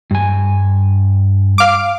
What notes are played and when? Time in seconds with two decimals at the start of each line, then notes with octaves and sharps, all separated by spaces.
0.11 G2 G#5
1.58 F5 D6